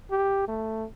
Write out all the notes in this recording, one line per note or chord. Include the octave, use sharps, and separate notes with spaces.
G4
A3